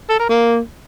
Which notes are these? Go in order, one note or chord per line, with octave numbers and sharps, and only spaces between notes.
A4
A#4
A#3